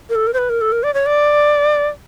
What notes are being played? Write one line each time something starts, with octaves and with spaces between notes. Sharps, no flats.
A#4
A4
A#4
C5
B4
A#4
A4
A#4
D5
C#5
D5